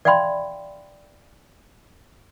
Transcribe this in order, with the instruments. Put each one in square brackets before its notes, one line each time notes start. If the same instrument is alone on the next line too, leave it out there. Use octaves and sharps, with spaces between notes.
[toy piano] D5 E5 F5 G5 B5 C6